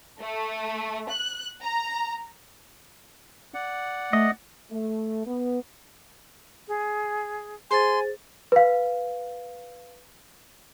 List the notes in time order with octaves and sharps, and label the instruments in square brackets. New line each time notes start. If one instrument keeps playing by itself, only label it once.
[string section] A3
F#6
A#5
[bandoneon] D5 F#5
[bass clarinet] A3 [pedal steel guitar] D#5
[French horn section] A3
B3
[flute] G#4
[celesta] G#4 C5 A6 [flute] G#5 [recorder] C6
[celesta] B4 F5